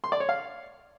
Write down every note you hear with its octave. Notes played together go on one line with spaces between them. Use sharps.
C6
D5
C#5
F5